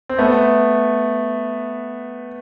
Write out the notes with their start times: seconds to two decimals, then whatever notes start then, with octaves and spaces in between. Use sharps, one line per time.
0.09 C4
0.19 A3 B3